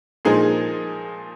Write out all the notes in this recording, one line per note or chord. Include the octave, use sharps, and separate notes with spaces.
A#2 F3 G#3 D#4 G#4